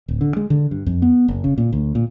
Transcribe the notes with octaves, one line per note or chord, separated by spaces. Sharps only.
D1
D3
G#3
D3
G2
F2
B3
F#1
C#3
A#2
D2
A#2